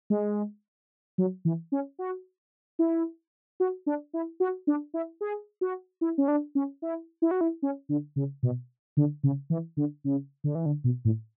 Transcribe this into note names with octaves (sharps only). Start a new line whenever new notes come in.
G#3
F#3
E3
C#4
F#4
E4
F#4
D4
E4
F#4
D4
E4
G#4
F#4
E4
C#4
D4
C#4
E4
E4
F#4
E4
C#4
D3
C#3
B2
D3
C#3
E3
D3
C#3
D3
E3
D3
B2
A2